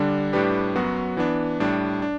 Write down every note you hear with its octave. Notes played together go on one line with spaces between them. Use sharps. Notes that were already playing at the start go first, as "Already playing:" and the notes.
Already playing: D3 G3 D4
A2 G3 D4 G4 B4
F#2 F#3 B3 F#4
E3 B3 D4
A2 G3 D4
D4